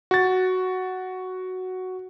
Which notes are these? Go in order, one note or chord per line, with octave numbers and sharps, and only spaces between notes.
F#4 A6